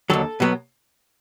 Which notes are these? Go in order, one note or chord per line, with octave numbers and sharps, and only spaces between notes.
D#2 D3 F#3 A4
B2 F#3 B3